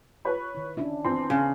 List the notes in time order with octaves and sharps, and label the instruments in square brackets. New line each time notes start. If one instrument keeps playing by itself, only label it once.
[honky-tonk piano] B4 C#5 B5
[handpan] D#3 E4
[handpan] C#4 D4 [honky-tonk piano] E4
[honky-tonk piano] E2 C4 C6
[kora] C#3 [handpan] C#4 G#4